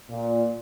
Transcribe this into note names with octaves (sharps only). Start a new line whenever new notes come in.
A#2